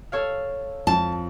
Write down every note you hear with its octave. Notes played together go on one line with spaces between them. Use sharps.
A4 C#5 F5
F2 A5